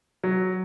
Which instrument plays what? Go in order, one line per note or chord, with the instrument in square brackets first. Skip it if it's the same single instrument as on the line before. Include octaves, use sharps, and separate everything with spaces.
[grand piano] F#3